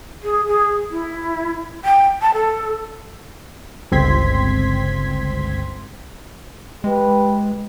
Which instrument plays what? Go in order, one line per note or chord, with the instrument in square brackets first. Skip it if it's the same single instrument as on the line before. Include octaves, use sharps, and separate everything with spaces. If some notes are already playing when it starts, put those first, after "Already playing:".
[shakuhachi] G#4
G#4
E4
G5
A5
A4
[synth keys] G1 C#2 C4 C6 G#6 B6
[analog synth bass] G#3 [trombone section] G4 B4